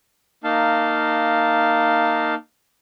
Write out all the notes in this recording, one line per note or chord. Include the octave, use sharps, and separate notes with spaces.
A#3 D#4 F5 A5